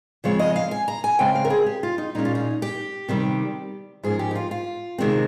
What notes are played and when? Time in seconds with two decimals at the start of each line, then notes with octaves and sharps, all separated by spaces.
0.24 C#3 F3 G#3 C4 C#5
0.39 D#5
0.56 F5
0.71 G#5
0.88 A#5
1.04 G#5
1.19 C#3 G#3 C4 G5
1.35 F5
1.45 A#4
1.50 G#4
1.66 G4
1.83 F4
1.98 D#4
2.15 A#2 G#3 C#4 D#4
2.25 F4
2.35 D#4
2.62 G4
3.09 C3 D#3 G3
4.03 G#2 F3 A#3 C#4 G#4
4.19 G4
4.31 D#4
4.35 F4
4.51 F4
4.98 C3 D#3 G#3 C4